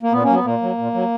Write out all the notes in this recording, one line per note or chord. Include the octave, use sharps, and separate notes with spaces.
A#3
A#2 B3
A#3 C#4
F#3 B3
A#2 A#3
F#3
A#2
F#3